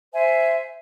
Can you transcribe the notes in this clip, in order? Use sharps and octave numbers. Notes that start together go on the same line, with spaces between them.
C5 E5 G#5